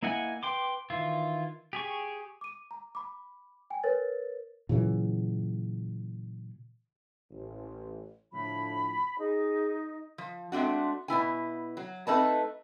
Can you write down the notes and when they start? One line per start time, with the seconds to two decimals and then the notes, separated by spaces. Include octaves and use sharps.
0.03 A#3 E4 D#5 F#5 G#5
0.43 B4 G5 C6 D6
0.90 D#3 E3 E4 F4
1.73 G4 G#4 C#6
2.41 D6 D#7
2.71 A#5
2.95 B5 D6
3.70 G5 G#5
3.83 A#4 B4 C#5 A6
4.69 A#2 C#3 E3 F#3
7.31 A1
8.33 A2 D3 F3 B5
9.19 D#4 G#4
10.18 F3
10.52 G#3 A3 C4 D4 F#4
11.08 B2 B3 E4 G#5
11.77 F#3
12.07 A3 C4 D#4 B4 D#5 A5